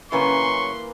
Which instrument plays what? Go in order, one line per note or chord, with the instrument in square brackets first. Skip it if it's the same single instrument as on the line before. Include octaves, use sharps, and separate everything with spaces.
[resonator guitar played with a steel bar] F#2 C#3 C#4 [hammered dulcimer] E3 A#3 [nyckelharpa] B4 C6 [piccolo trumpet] C#6